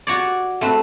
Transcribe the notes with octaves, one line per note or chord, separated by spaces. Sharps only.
F#4 C#5 D5
A3 C4 B4